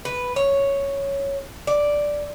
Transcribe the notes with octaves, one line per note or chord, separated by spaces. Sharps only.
B4
C#5
D5